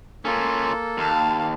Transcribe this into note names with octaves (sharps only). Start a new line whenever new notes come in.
A#3 C#4 F4 A4
D#2 F5 A5